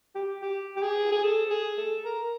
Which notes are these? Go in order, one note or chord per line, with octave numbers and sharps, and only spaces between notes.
G4
G4
G4
G#4
G#4
A4
G#4
A4
A#4